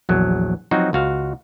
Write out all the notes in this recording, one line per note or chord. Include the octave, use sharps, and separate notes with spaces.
A#1 E2 F#3
F3 F#3 C4 D#4 F#4
C#2 F#4 F5